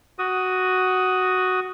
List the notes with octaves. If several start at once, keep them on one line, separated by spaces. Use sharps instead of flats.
F#4 D#6